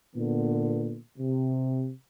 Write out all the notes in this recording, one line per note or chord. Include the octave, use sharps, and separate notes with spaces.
A#2 D3 B3
C3